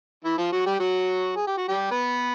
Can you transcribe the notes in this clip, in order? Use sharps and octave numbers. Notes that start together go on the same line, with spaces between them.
E3 E4
F3 F4
F#3 F#4
G3 G4
F#3 F#4
G#4
G4
F#4
G3 G4
B3 B4